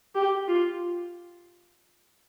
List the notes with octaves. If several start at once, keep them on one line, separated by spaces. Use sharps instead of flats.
G4
F4